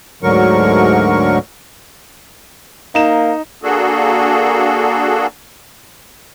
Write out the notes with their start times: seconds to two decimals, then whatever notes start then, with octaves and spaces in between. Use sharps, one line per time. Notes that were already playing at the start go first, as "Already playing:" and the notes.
0.23 D2 G#2 D3 F#3 A#4 C#6
2.95 A#3 D#4 E7
3.63 A#3 D4 F#4 G#4 A4